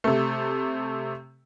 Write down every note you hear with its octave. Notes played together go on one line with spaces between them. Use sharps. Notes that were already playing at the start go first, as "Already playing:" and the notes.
C3 A3